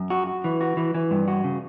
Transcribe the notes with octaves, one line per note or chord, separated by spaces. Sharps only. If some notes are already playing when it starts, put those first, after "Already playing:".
Already playing: F#2
F#4
F#4
E3
F#4
E3
E3
G2
F#4
C#3